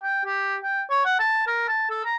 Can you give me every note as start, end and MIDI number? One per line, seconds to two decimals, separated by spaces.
0.03 0.24 79
0.25 0.57 67
0.63 0.82 79
0.90 1.02 73
1.05 1.16 78
1.19 1.44 81
1.47 1.67 70
1.68 1.89 81
1.90 2.00 69
2.05 2.16 82